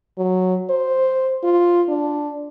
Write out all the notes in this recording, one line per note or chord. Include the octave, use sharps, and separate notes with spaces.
F#3
C5
F4
D4